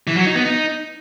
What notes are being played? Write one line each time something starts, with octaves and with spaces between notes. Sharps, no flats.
E3
F#3
D#4
B3
D#4